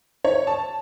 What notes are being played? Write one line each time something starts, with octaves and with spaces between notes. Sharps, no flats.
C#5
A5